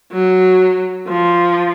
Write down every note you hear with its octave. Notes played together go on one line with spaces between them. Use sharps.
F#3
F3